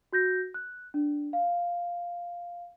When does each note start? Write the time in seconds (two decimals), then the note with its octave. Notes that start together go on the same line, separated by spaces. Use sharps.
0.13 F#4 G6 A#6
0.54 F#6
0.94 D4
1.33 F5